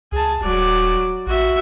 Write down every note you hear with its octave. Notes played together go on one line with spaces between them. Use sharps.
C#2 G#4 A5
D#1 F#3 D5
A1 F#4 E5